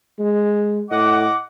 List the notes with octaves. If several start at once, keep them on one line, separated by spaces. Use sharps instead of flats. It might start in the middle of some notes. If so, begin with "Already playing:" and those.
G#3
A2 D#5 F#5 D6